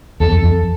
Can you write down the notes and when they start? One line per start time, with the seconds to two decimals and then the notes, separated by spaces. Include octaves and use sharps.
0.20 E2 A4
0.32 F2
0.43 F2